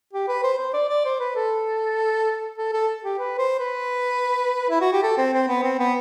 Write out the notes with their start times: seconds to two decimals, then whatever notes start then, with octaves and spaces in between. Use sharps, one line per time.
0.13 G4
0.28 B4
0.43 C5
0.58 C5
0.73 D5
0.89 D5
1.05 C5
1.20 B4
1.36 A4
2.58 A4
2.73 A4
3.04 G4
3.19 B4
3.38 C5
3.59 B4
4.69 E4
4.81 F#4
4.92 G4
5.03 A4
5.18 C4
5.33 C4
5.48 B3
5.63 C4
5.79 B3